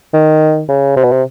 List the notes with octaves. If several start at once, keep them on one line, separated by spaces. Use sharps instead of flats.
D#3
C#3
C3
B2
C3